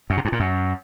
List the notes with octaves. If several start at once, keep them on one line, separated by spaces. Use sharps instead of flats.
F#2
C3
G2
A#2
F#2